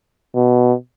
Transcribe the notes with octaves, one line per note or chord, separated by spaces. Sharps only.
B2